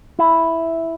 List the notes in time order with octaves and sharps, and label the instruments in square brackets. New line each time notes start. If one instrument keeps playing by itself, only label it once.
[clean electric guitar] E4